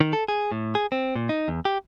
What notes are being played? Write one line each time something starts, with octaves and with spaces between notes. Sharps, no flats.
D#3
A4
G#4
A2
G#4
C4
A#2
D#4
E2
G4